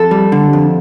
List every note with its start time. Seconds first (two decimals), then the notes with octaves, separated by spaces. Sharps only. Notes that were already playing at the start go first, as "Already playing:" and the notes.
Already playing: F2 A4
0.11 G3
0.32 D3
0.53 F2